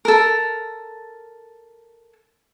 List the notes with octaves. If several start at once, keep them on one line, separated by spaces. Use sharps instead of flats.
A4 A#4